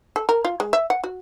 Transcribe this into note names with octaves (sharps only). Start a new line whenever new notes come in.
A4
A#4
F4
G#3
E5
F#5
F#4